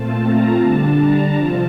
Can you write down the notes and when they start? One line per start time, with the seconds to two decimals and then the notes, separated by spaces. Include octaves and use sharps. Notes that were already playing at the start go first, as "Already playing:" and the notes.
Already playing: A#2 A3 C4 F4 A5
0.24 A#5
0.60 D3 G3 D4 A5
0.98 A#5
1.34 C3 F3 C4 F4 A5